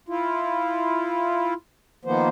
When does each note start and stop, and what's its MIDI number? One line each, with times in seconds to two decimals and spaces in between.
0.09 1.54 64
0.09 1.54 65
2.05 2.29 51
2.05 2.29 53
2.05 2.29 58
2.05 2.29 59
2.05 2.29 72